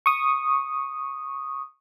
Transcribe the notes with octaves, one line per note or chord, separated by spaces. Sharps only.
C#6 D#6